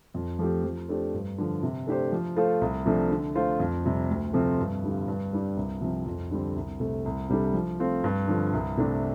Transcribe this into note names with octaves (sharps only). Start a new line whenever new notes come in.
F2
F3 A3 C4 G4
F3
A3 D4 G4 C5
G2
D3 F3
C3
A3 D4 G4 C5
F3
A3 F4 A4 C5
C2
C3 F3 A3 D4
D3
A3 F4 C5
F2
C3 G3
D2
C3 F3 A3 C4
G2
D3 G3 F4
G2
G3 D4 G4
C2
C3 F3 C4
F2
D3 G3 C4
C2
C3 A3
C2
C3 G3 D4 A4
F3
A3 C4 F4
G2
D3 F3
C2
C3 A3 D4 A4